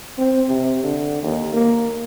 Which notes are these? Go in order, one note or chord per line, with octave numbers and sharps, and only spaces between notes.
C4
C3
D3
D#2
A#3